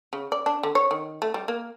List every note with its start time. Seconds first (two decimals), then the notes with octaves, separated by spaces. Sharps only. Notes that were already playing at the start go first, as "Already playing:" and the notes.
0.13 C#3
0.32 D5
0.46 D4
0.63 D3
0.75 C#5
0.91 D#3
1.22 A3
1.34 G3
1.48 A#3